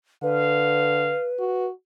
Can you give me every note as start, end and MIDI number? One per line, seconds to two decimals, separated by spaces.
0.23 1.15 50
0.23 1.66 71
0.23 1.32 77
1.39 1.70 66